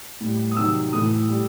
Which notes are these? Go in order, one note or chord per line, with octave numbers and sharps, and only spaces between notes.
A2 G3
D#6
C3 D#3 F#3 E6
A2 E3 A3 D#6
G3